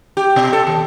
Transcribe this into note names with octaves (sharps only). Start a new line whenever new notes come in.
G4
B2
A4
D#2